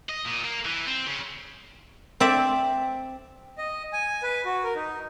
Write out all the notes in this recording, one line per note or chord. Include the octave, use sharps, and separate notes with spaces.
D#5
A#2
A#3
E3
C4
C#3
C4 D5 E5
D#5
G#5
B4
F#4
A#4
D#4